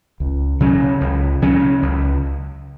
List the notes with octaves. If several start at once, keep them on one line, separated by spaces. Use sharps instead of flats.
C#2
C#3 F#3 C#4
C#2
C#3 F#3 C#4
C#2